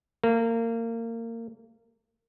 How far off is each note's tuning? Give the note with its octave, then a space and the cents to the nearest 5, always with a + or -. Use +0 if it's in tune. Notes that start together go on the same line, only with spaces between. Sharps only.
A#3 -25